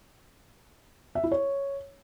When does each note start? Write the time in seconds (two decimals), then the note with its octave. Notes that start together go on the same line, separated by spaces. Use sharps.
1.15 E5
1.23 E4
1.31 C#5